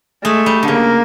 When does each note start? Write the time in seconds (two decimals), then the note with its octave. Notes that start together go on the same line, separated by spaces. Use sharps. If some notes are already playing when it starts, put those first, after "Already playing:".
0.24 G#3 A3
0.46 G3
0.63 D3
0.68 C#3 A#3